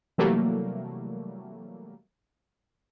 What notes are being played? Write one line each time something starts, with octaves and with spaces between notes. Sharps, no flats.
C3 E3 F#3 G3 A3 A#3